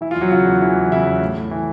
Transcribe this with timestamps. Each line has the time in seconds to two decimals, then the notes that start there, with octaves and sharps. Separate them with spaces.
0.01 E3 E4
0.11 F4
0.16 E2
0.21 F#3 F#4
0.31 C#3 F4
0.47 E2
0.61 E3
0.76 E2
0.92 C#3 E4
1.07 E2
1.21 A2
1.37 A2
1.51 E3